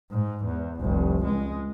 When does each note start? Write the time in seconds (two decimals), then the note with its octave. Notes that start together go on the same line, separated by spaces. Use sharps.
0.11 G#2
0.44 E2
0.80 F1 C2
1.25 C#2 G#3